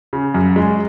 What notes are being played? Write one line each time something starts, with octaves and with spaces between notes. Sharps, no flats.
C#3
F#2
G#3